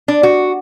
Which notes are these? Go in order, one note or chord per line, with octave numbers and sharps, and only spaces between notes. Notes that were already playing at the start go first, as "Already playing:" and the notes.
D4
F#4